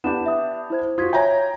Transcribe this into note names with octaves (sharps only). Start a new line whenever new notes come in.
B3 D4 E4 G4 F#5 E7
E5 D#6
E4 C5 G#6
F4 F#4 D#6 G#6 B6
C#5 E5 G5 G#5 A#5